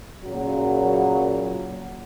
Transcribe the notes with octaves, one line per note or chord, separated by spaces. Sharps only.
A#2 C#3 F#3